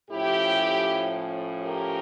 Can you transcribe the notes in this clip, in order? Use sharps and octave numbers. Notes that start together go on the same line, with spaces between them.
A2 F3 C#4 E4 G4
G4 A#4